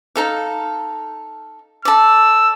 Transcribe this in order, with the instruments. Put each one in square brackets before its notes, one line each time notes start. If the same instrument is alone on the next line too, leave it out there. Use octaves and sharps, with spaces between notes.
[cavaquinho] D#4 A4 F5
[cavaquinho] A4 D5 [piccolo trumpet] E6